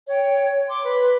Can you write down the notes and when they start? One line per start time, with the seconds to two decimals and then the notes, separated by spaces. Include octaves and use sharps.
0.09 C#5 G5
0.69 C6 D6
0.85 B4